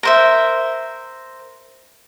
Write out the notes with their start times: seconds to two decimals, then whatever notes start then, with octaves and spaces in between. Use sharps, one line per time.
0.03 A#4 C5 E5